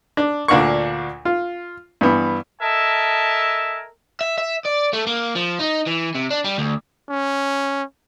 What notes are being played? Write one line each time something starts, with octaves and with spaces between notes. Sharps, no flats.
D4
D2 A#2 D4 F5 F#5 C#6
F4
G2 E3 B3
A4 A#4 D#5 E5 G#5 A5
E5
E5
D5
A3
A#3
F3
D#4
E3
C3
D4
G3
D2
C#4